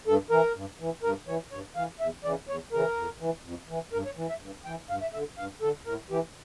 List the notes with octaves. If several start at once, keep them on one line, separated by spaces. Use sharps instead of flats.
G2 A4
E3 A#4
G2
E3
G2 A#4
E3 C#5
G2 C#5
E3 F5
E2 E5
C#3 E3 D5
E2 C#5
C#3 E3 A#4
F2
E3
F2
E3
G2 A#4
C#5
E3
E5
G2
E3 G5
G2 F5
E5
D3 E5
G2 F5
D3 A4
A2 A#4
E3 G4